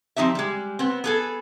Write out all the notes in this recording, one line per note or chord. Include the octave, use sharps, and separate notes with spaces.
F3 C4 D#4 G4 E5
G3 G#3
B3 C4
B3 G#4 A4